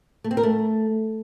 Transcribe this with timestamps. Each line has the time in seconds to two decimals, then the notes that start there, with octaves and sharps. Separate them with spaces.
0.24 A3
0.31 C4
0.37 A#4
0.43 A3